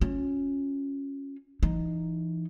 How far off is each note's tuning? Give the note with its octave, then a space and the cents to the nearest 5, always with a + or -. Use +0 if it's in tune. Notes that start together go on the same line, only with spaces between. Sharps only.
C#4 +0 F4 +40
E3 +25 D#4 -5